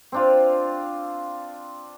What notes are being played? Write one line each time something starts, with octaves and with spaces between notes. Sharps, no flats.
C4 D4 F4